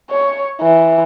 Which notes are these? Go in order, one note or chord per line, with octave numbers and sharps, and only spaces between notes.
C#5
E3